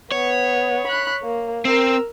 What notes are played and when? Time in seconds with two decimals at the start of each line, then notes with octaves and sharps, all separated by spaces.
0.12 B3 C#5
0.87 B5 F#6
1.23 A#3
1.65 C4 A#4 E6